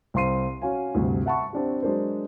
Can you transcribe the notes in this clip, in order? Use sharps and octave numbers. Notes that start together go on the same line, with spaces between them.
C2 C4 F5 C6 C7 D#7
C#4 F#4 C#5 F5 G#5
D2 G2 C3
E5 F#5 A5 B5 C#6
C4 D4 G4
F#3 G#3 D4 A#4 C5